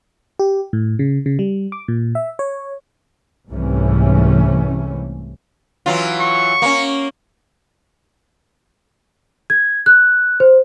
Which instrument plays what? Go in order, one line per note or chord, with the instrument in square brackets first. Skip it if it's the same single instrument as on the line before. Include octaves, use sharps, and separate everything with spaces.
[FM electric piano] G4
A2
C#3
C#3
G3
D6
A#2
E5
C#5
[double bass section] C2 G#2 C3 E3 A3 C#4
[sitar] E3 F#3 F4
[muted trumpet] C#6
[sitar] A#3 C#4
[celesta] G#6
F#6
C5